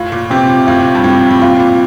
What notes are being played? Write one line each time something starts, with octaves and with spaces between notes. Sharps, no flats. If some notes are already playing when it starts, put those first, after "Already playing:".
Already playing: A2 F4
A#2
C3 C4
A#2
A2 F4
G2
A2 C4
A2
A#2 F4
A#2